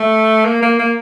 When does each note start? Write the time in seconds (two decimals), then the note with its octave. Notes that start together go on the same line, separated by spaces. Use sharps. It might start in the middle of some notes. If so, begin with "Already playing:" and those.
Already playing: A3
0.45 A#3
0.62 A#3
0.79 A#3